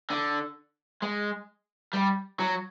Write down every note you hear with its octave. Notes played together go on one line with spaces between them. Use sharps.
D3
G#3
G3
F#3